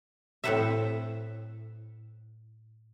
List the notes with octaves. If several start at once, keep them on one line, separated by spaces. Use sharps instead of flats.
A2 C4 A4 B4 C5 E5